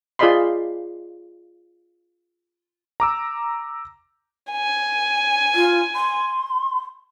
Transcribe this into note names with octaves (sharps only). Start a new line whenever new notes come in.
F4 G#4 D5 D#5 B5 C6
A#5 D6 E6
G#5
F4
C6